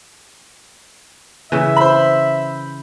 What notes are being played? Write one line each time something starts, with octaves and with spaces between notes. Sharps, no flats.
C#3 E3 E5
C5 B5